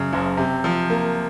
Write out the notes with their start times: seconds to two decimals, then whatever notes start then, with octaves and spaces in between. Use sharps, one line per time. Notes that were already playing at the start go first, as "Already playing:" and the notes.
Already playing: F#2 C#3
0.13 F#1
0.37 C3
0.64 F3
0.90 A#3